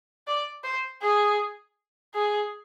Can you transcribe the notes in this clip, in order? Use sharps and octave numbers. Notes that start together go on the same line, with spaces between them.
D5
C5
G#4
G#4